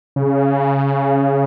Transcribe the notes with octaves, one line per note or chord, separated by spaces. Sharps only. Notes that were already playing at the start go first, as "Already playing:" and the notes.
C#3